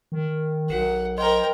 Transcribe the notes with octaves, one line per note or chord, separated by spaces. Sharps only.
D#3
B1 F#4 A#4 F#5
A#4 C5 D#5 G5 C6